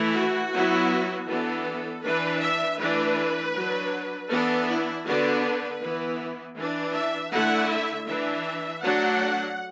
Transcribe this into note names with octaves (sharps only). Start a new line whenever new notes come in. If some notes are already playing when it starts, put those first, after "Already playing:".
Already playing: E3 A3 E4
F#4
F#3 B3 E4
E3 B3 D4 A4
E3 D4 B4
E5
E3 A3 D4 B4
F#3 D4
E3 B3 D4 A4
E4
D3 B3 D4 F#4
B4
E3 B3 E4
E3 D4
E5
D3 A3 E4 F#5
E5
E3 D4 E5
F#3 A3 D4 F#5